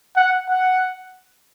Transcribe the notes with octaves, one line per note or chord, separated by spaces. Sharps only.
F#5
F#5